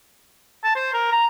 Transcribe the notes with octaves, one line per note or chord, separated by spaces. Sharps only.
A5
C5
A#4
A#5